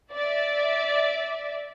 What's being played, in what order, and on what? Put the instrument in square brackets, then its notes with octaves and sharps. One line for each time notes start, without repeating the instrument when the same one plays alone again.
[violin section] D5 E5